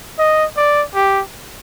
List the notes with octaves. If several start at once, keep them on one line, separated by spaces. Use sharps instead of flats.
D#5
D5
G4